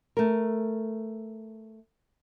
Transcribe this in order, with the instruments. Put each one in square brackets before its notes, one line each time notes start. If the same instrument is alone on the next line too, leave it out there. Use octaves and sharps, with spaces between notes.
[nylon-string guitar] A3 A#4